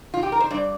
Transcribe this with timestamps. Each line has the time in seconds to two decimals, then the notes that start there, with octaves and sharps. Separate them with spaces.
0.14 F4
0.23 G4
0.32 A#4
0.40 C5
0.51 G2 D5